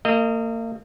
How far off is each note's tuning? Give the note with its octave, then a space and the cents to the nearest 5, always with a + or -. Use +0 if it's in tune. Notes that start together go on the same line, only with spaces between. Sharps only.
A#3 -35 D#5 +0